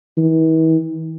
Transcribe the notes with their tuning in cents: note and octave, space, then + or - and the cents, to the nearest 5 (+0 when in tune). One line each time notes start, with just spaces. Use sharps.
E3 -40